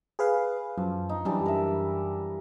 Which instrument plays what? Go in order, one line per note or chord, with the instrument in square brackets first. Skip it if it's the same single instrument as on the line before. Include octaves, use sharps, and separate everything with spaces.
[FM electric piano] G#4 B4 F5
[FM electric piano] F#2 [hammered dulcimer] F3
[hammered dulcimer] D#4
[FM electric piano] F#2 [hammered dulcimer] E3 G3 D4
[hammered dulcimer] A#4 E5